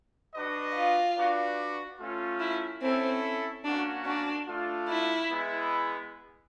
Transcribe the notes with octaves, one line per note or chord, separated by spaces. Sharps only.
D4 F#4 B4 D#5
F4
D4 F#4 B4 D5
A3 C#4 F4
E4
C4 C#4 E4 A4
A#3 C#4 D4 F#4
D4
A3 D4 F4
E4
G#3 B3 E4